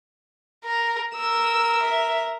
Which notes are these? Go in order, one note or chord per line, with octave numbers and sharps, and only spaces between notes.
A#4
A#4 E6
E5